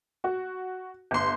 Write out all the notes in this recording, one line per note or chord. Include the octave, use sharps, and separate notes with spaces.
F#4
G1 C6